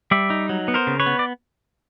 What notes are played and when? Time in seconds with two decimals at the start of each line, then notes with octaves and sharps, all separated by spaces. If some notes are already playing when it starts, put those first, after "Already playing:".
0.11 G3 D5 E5
0.30 D#4
0.49 F#3
0.68 B3
0.74 A#4 C5
0.87 C#3
1.00 B4 C#5
1.06 B3
1.19 D5